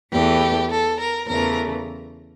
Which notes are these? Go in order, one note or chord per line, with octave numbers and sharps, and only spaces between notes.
E2 E3 A3 G4
A4
A#4
E2 C#3 E3 A3 A#4